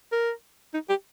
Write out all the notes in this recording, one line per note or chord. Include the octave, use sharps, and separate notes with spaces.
A#4
D#4
G4